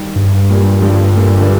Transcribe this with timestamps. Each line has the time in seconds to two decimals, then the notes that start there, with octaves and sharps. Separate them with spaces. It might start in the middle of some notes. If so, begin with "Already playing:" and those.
Already playing: D#3 G3
0.16 G2
0.50 A#2
0.82 D3 F3
1.16 A#2 D3
1.41 D3